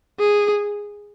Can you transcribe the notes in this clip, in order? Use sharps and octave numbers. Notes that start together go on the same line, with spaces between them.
G#4